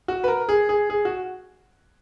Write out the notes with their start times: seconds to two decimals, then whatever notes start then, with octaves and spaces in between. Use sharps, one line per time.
0.08 F#4
0.24 B4
0.28 A#4
0.49 G#4
0.69 G#4
0.90 G#4
1.05 F#4